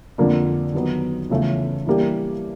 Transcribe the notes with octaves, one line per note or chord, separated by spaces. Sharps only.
F2 D3 F3 A#3 D4
D#3 F#3 B3 D#4
E2 C#3 F3 A3
E3 G3 A#3 D4 G4